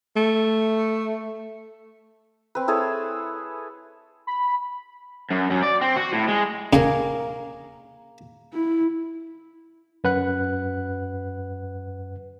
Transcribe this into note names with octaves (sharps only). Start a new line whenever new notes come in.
A3
C4 B4
E4 G#4 A4 C#5
B5
F#2
F#2
D5
C4
F#4
A2
G#3
C#3 A#3 G#4 A#4
E4
F#2 B4 F#5 F#6